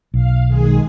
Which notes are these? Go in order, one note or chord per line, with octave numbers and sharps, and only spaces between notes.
B1 F5
D#3 G#3 G#4